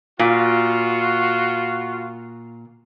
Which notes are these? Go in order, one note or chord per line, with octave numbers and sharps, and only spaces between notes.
A#2 F4 F#4